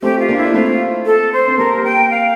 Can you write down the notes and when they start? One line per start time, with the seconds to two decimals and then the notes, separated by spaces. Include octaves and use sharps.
0.02 A3 C4 G4
0.19 F4
0.28 A#3 D4
0.37 E4
0.45 D4
0.54 A3 C4 F4
1.06 A4
1.33 C5
1.47 C4
1.57 G3 A#3 A#4
1.84 G5
2.10 F5